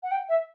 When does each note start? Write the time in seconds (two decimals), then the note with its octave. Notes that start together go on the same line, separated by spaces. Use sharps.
0.03 F#5
0.11 G5
0.29 E5